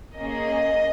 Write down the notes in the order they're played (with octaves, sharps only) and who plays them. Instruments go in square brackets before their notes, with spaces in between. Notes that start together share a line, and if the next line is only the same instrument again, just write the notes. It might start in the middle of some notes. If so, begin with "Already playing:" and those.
[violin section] A#3 C#4 G#4 D#5